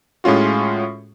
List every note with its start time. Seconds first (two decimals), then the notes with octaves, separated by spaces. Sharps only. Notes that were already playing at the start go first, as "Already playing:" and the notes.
0.24 A2 G#3 C#4 F4 F#4